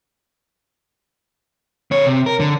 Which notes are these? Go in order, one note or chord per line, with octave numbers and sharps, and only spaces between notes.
D3 C#5
C3
A#4
D3